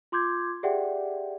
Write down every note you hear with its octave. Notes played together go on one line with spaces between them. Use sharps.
F4 C6 D6 G6 G#6
G4 G#4 D5 E5 F#5 G5